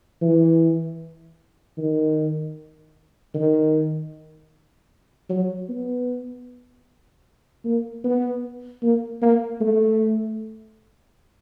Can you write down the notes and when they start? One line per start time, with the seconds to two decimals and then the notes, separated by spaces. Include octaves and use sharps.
0.22 E3
1.78 D#3
3.35 D#3
5.30 F#3
5.69 B3
7.65 A#3
8.04 B3
8.83 A#3
9.22 A#3
9.61 A3